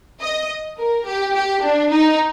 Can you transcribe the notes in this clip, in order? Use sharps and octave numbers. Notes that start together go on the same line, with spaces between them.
D#5
A#4
G4
G4
D4
D#4